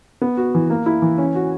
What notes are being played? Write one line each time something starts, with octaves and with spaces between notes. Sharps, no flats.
B3
F#4
E3
A#3
E4
E3
C#4
F#4